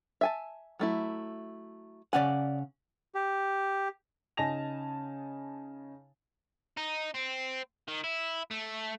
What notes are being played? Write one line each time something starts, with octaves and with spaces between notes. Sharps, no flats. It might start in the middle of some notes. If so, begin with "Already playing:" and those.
E5 G#5 A5
F#3 A3 E4
C#3 C#4 D5 F#5 G#5
G4
C#3 D#4 G#5 A5 A#6 F7
D#4
C4
D#3
E4
A3